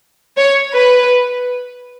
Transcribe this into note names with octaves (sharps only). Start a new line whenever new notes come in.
C#5
B4